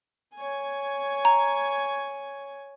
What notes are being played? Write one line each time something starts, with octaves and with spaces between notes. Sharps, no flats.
C#5 G#5
A#5